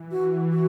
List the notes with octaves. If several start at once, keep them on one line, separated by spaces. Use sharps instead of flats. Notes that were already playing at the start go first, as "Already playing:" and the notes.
Already playing: E3
F#4
F#4